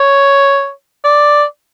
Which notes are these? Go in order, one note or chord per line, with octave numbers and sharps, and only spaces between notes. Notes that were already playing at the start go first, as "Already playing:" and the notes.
Already playing: C#5
D5